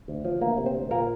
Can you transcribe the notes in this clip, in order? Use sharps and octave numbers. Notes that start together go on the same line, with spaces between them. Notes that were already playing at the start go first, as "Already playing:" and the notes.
D2
F3
D2 A#3 A#4
C3
C4 C5
D2
A#2 A#3 A#4